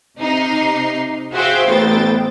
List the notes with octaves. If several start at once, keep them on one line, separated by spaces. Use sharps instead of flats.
C3 D#4 C7
F#4 G#4 C5 E5 F5 G5
A1 B3 C5 G5 A6